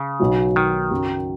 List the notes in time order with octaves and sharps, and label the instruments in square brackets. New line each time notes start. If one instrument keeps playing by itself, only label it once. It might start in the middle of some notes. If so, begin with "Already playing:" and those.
Already playing: [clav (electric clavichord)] C#3
[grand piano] B1 B2 F#3
[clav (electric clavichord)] D#3
[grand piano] F#2 C#3 F#3